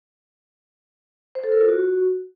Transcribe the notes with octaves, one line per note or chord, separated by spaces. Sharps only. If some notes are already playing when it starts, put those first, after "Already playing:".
C5
A4
A#4
F4
F#4